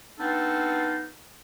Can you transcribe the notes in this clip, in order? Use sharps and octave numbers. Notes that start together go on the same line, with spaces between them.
B3 C4 D4 D#4 F4 A4